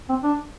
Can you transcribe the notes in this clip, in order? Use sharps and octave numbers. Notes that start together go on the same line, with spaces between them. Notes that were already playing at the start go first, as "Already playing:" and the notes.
C4
D4